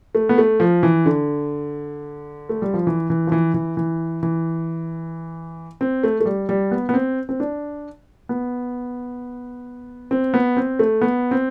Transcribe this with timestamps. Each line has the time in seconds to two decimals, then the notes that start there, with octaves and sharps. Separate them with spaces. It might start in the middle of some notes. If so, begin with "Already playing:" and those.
0.15 A3
0.29 B3
0.38 A3
0.60 F3
0.83 E3
1.06 D3
2.49 A3
2.62 G3
2.74 F3
2.87 E3
3.10 E3
3.27 F3
3.32 E3
3.54 E3
3.77 E3
4.23 E3
5.81 C4
6.03 A3
6.20 A3
6.26 G3
6.49 G3
6.71 B3
6.89 B3
6.94 C4
7.29 C4
7.40 D4
8.29 B3
10.11 C4
10.34 B3
10.57 C4
10.79 A3
11.01 B3
11.31 C4